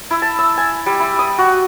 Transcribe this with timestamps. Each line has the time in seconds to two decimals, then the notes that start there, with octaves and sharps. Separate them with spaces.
0.11 E4
0.22 A5
0.38 E6
0.57 G#5
0.86 G3
1.00 E4
1.19 D#6
1.38 F#4